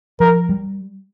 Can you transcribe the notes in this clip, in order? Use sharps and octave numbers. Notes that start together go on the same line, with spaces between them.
F3 A#4
G3